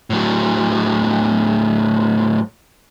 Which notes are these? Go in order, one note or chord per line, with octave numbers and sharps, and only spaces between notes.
A2 F#3